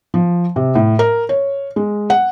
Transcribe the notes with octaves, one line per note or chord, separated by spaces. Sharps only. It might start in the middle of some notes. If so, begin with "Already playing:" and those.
F3
C3
A2
A#4
C#5
G#3
F#5